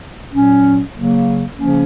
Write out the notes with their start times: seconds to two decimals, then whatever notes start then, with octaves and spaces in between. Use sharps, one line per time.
0.29 A#2 F#3 C#4
0.92 C#3 F#3 A#3
1.56 C#3 F3 A#3 C#4